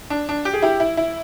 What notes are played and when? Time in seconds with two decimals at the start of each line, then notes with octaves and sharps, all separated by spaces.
0.10 D4
0.29 D4
0.45 G4
0.54 G#4
0.62 E4 G4
0.80 E4
0.97 E4